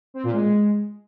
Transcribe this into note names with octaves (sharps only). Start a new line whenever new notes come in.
C4
A#2
G#3